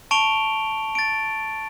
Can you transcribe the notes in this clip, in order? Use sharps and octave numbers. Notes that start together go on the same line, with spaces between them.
A5 C#6 D7 F7 G7
A6 D7